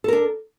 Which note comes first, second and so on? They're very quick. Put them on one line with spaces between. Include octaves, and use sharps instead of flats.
A4 A#4 D4